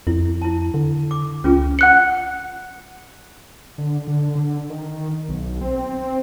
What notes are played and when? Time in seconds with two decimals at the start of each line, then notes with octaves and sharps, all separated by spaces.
0.07 F2 E4
0.42 E4 A5
0.74 D3
1.11 D6
1.44 C#2 C#4 F4 G#4
1.79 F#5 F#6 C#7
3.78 D3
4.07 D3
4.35 D3
4.70 D#3
5.29 B1
5.61 C4